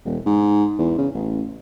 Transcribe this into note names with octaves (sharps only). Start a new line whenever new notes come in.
E1
G#2
E2
C#3
A1